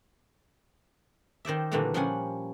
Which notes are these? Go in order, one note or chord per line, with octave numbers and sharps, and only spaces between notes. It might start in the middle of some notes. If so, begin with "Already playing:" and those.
D#3 C5 D5 E5
A#2 D3 E3 G3 A3 A#3
F3 G3 C#4 F#5 G#5